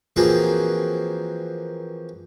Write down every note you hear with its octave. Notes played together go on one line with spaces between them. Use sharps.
E3 F3 A#3 C4 F#4 G#4